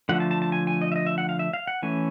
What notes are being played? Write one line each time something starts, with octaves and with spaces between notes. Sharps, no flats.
D3 F3 A3 F#5
A5
A5
A5
G#5
G#5
D#5
E5
D#5
E5
F#5
F5
E5
F5
F#5
E3 A3 C#4 G#5